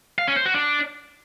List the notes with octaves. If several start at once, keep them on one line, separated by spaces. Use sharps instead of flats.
F5
C#4
C5
F#4
D4